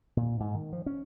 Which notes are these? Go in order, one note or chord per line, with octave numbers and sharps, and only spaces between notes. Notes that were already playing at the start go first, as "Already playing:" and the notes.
A#2
G#2
D#3
F3
C#4